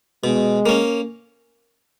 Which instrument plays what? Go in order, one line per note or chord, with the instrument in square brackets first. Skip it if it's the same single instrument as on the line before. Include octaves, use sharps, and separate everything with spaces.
[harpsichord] B2 [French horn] G#3
[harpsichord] A#3 C#4